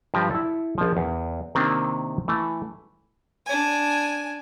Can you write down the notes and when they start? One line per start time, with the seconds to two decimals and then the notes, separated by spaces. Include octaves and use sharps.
0.14 G2 F3 G4 A#5
0.31 E4 A4
0.78 A#1 F3
0.97 E2
1.55 C3 D#3 A#3 C4 D4 G5
2.28 E3 A3
3.46 D4 G#5